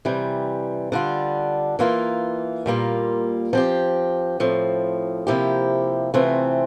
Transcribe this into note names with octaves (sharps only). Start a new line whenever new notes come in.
C3 E3 G3
D3 G3 D4 F4
E3 A#3 F4
A#2 G3 A#3 F4
F3 C4 G4
A2 F3 C4
C3 F3 A#3 E4 G4
C3 E3 A3 C4 F4